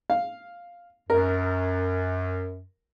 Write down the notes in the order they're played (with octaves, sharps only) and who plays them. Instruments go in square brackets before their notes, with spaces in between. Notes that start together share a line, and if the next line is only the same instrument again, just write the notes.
[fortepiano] F5
[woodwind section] F#2 [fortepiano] A#4